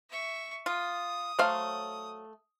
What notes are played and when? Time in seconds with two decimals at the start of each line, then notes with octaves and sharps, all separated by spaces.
0.10 E5 C#6
0.66 F4 D#6
1.39 F#3 A3 C5 C#5 F5